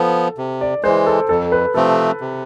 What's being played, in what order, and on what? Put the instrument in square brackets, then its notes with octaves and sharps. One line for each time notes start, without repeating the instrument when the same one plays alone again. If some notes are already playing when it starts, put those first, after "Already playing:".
Already playing: [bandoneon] F3 B3 [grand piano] A4
[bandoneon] C3
[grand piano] D5
[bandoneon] G#3 [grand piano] C5
[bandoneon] E3
[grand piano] A4
[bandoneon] F2 [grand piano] A4
[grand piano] B4
[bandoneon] C3 F3 A3 C4 [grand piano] A4
[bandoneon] C3